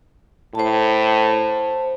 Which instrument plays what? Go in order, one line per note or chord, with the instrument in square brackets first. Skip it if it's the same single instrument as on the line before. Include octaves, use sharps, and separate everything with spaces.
[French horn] A2 [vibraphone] C5 A5